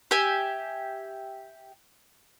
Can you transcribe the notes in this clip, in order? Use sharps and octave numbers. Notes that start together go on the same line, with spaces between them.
G4 E5 G#5